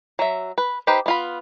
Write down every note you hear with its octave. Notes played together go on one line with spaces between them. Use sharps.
F#3 E5
B4
D#4 G4 B4 C5
B3 F4 B5